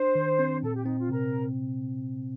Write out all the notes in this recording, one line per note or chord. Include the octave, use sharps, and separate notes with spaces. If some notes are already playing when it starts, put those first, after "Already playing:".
Already playing: D4 C5
D#3
C4
A#2 A4
G4
C4 D#4
F4
C3 A#4